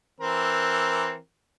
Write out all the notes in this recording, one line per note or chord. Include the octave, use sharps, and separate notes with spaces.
E3 C4 A#4